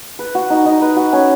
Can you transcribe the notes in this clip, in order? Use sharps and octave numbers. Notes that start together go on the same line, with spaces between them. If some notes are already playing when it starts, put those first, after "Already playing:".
B4
F#4
D#4
D#4
B4
F#4
C#4